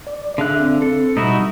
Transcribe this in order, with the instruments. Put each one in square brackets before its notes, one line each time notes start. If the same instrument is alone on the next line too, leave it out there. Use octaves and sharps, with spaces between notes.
[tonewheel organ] D5
[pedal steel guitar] D3 F5 F#6 [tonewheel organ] G#4 E5
[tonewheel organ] C4
[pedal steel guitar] A4
[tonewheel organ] B2 G3 [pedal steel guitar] D#4 E4 F#4